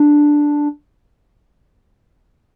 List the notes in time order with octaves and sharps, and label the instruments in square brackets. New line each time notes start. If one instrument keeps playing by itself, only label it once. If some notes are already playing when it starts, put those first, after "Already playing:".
Already playing: [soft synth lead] D4